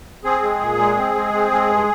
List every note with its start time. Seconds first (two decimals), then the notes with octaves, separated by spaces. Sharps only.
0.24 C4 G#4
0.43 G#3
0.61 A#2
0.79 G#3
0.97 C4
1.15 G#3
1.33 C4
1.51 G#3
1.69 G2